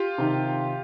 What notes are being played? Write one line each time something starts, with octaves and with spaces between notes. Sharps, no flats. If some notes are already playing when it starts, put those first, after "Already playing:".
Already playing: F4 G4
C3 D#3